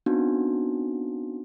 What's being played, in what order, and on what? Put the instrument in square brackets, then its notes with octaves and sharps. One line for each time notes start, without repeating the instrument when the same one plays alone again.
[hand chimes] B3 C4 D4 D#4 F#4